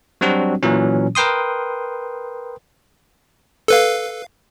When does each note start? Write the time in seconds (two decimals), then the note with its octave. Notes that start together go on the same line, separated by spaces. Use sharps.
0.21 F#3 G3 C4 D4 F#4
0.63 A#2 E3 F#3 C#4
1.15 A#4 B4 G5 C6 D#6
3.68 A4 B4 F5